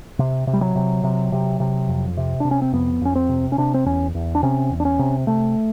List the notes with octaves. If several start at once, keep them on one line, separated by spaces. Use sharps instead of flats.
C3
C3
G3
F#3
C3
C3
C3
C3
F2
C3
C3 D4
C#4
C4
F2 B3
F2 C#4
C4
C3
C#4
C3 D4
C4
E2 C#4
E2
D4
C3 C#4
E2
D4
C#4
C3
C3 A3